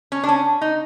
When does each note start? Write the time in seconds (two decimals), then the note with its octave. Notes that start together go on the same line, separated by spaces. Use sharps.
0.12 C#4
0.24 D4
0.28 C#4
0.61 D#4